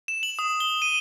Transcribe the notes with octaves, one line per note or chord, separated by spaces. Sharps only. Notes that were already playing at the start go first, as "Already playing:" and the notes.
E7
F#7
D#6
G7
D#7